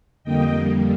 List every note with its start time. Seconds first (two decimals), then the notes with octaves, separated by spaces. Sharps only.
0.24 F2 D3 G3 A#3 D#5 G5